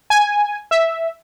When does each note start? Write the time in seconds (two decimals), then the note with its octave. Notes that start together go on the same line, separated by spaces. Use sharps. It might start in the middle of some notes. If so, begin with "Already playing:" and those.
0.10 G#5
0.71 E5